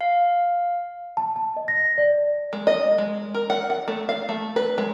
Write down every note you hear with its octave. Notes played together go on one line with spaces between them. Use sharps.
F5
A5
A5
D#5
A#6
D5
G#3
D#5
G#3
A#4
F#5
F#5
A3
F5
A3
B4
G#3